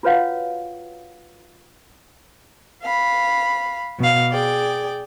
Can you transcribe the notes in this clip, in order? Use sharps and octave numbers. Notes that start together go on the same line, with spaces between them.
F4 F#4 B4 C#5 F5 F#5
F5 B5
B2 F5
G#4 D5 G5